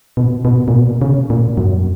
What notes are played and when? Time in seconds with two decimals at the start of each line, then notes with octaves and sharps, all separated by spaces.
0.17 B2
0.45 B2
0.68 A#2
0.74 B2
1.02 C#3
1.30 A#2
1.57 F#2